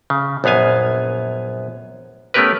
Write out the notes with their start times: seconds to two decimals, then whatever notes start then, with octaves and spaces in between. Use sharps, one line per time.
0.10 C#3
0.44 A#1 F#2 B3 F5 G#5
2.34 A3 B3 C#4 G4 A#4 B4